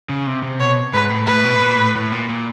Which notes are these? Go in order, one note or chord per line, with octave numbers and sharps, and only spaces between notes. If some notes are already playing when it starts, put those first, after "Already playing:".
C#3
C3
C3
B2 C#5
G#2 B4
A2
A2 B4
B2
A2
A#2
A2
A2
A#2
A#2